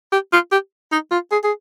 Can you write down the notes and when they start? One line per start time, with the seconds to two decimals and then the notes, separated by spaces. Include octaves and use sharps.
0.12 G4
0.32 F4
0.51 G4
0.92 D#4
1.11 F4
1.31 G#4
1.44 G#4